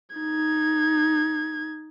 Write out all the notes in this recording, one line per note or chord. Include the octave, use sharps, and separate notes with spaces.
D#4 G#6